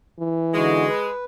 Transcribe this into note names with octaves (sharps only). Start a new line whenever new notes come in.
E3
D3 G#3 D#4 F#4
B4